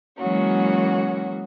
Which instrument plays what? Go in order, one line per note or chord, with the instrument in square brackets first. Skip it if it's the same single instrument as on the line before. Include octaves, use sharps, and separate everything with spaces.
[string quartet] E3 F#3 G#3 A#3 C#4 F#4